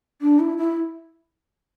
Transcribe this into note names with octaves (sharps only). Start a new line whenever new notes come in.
D4
E4
E4